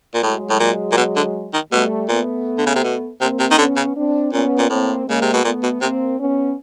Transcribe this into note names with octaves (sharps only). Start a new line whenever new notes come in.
A#2
A2 F#3 G#3
A2
A#2
A#2
B2
D3
D#3
B2 G3 A3
A#2 A3 B3
D3
C#3
C3
B2
C3 A#3 C4
C3
D#3
D3 B3 C#4
C#3
C4 D4
A#2 B3 C#4
A#2
A2 A#3 C4
C#3 G#3 A#3
C3
B2
A#2 A3 B3
B2
C3 A#3 C4
B3 C#4